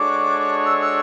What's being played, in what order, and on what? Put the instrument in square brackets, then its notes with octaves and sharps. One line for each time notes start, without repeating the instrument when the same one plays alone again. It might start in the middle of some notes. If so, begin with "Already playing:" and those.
Already playing: [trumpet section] G#3 D4 F#4 A4 C#5 [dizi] D6
[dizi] E6
E6